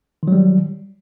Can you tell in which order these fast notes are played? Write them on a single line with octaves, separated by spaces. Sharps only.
D#3 F#3 G3